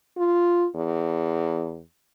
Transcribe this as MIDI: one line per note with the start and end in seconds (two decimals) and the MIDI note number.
0.17 0.66 65
0.75 1.81 40